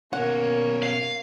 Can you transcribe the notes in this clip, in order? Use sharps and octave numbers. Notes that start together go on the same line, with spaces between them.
B2 A#3 C#4 C#5 F#5
F5